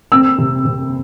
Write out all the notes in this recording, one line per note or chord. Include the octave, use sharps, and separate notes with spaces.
C4 E6
C3
C3